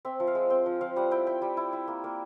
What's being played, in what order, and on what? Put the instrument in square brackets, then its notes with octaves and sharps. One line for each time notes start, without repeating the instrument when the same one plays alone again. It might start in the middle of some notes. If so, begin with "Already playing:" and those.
[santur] C4 E5
F3
F5
G#3
C4 G5
F3
F3 F5
G3 F#5
E4 G5
E4 G5
G3
E4
E4
A#3
A#3